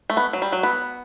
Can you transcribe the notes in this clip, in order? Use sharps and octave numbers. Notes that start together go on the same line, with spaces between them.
A3
B3
F#3
G3
F#3
B3